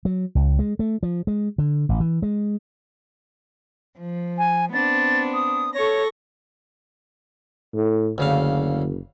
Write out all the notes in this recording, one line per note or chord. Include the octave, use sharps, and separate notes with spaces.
F#3
C#2
G#3
A3
F3
G#3
D3
A1
E3
G#3
F3
G#5
B3 C4 D4 A6
D#6
A4 C#5 C#6 A#6
A2
F#1 D2 C#3 F5